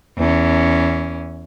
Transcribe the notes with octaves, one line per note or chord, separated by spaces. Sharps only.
E2 C#4